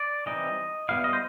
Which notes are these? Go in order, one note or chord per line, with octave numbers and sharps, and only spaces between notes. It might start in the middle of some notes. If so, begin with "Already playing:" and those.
Already playing: D5
E3 G3 C4 D#4 D#5
G3 B3 E4 F5
D#5
C5